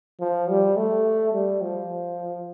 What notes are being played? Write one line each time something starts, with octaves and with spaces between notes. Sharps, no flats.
F3
G3
A3
G3
F3